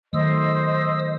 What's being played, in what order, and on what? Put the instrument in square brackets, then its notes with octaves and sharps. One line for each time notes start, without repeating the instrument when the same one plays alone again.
[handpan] D#3 F#3 A3 [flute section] C5 D#5 [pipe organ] D#6 E6